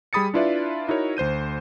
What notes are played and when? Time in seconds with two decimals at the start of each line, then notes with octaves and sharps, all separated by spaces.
0.13 G3 G#4 B5 D#6 A6 C#7
0.34 D4 E4 F4 B4 D5 E5
0.88 D#4 E4 F#4 A#4 C#5
1.17 D2 C5 G6 D#7